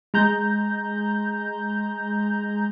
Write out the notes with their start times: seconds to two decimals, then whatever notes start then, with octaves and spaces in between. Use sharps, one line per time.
0.14 G#3 A#5 G6